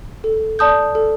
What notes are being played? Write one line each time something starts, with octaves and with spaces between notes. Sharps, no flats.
A4
D5 A5 D#6 G6
A4